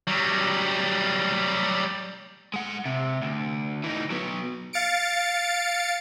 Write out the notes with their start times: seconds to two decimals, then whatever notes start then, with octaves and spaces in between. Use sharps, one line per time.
0.07 F#3 G3
2.54 G#3 F#5
2.85 C3
3.22 D2
3.84 E3 D#4
4.10 F#3 B3
4.73 F5 A6 C#7 D7